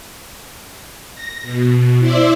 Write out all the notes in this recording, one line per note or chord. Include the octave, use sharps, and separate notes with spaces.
A#6
B2
E4 C5 D5 E5